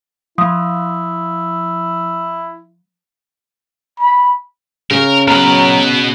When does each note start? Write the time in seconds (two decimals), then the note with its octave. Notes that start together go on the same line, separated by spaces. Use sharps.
0.38 F3 E4 D#6
4.00 B5
4.91 C#3 A#4
5.28 B2 F#3 A#4 B4